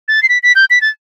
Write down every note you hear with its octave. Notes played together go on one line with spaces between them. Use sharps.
A6
C7
B6
B6
G6
B6
A6